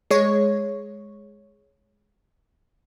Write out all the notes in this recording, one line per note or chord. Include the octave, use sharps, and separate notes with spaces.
G#3 C#5